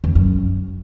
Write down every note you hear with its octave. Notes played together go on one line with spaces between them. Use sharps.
E2
F#2